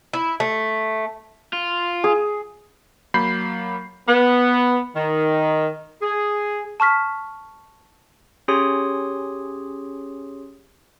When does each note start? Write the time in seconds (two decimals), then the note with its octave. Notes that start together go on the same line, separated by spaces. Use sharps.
0.13 E4
0.40 A3
1.53 F4
2.04 G#4
3.14 F#3 A#3 B5 G6 C7
4.08 B3
4.96 D#3
6.02 G#4
6.80 A5 C#6 F6 B6
8.48 C#4 G4 G#4 C#5 C6 D#6